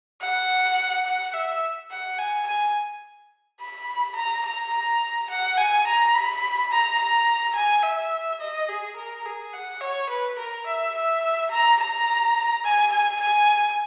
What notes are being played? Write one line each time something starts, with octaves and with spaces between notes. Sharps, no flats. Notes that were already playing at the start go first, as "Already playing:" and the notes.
F#5
F#5
E5
F#5
G#5
G#5
B5
A#5
A#5
A#5
F#5
G#5
A#5
B5
A#5
A#5
G#5
E5
D#5
G#4
A#4
G#4
F#5
C#5
B4
A#4
E5
E5
A#5
A#5
G#5
G#5
G#5